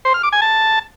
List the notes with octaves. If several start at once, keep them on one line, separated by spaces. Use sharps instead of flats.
C5
F6
D6
G#5
A5